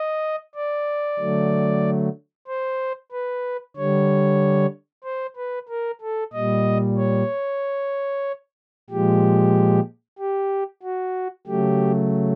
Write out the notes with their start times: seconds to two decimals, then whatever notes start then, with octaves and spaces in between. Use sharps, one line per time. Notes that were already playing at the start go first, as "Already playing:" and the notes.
Already playing: D#5
0.55 D5
1.19 D3 F#3 A3
2.48 C5
3.12 B4
3.76 D3 G3 C#5
5.04 C5
5.37 B4
5.68 A#4
6.01 A4
6.33 A#2 G3 D#5
6.97 C#5
8.90 A#2 F3 G#3 G4
10.19 G4
10.83 F#4
11.47 C#3 F#3 A3 G4